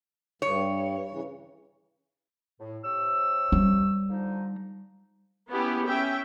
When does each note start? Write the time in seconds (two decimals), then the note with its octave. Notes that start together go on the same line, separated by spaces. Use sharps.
0.42 G2 C#5
1.11 C#3 E3
2.60 A2
2.84 C3 C#5 E6
3.52 G3
4.09 D3 F3 D#4
5.49 B3 C#4 E4 G4
5.86 C#4 E5 G5